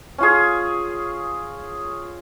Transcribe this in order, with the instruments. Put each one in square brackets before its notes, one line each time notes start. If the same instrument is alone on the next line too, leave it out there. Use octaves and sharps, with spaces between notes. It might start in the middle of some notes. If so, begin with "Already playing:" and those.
[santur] C#4 F4 G#4